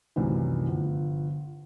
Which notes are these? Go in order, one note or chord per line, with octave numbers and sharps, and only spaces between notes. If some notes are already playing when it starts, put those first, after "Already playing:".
C2 F#2 A2 C3 D#3 E3
G1 F3